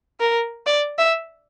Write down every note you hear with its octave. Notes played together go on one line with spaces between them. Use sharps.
A#4
D5
E5